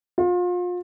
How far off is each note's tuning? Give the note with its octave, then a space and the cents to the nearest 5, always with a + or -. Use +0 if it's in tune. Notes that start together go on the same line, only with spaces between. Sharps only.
F4 +35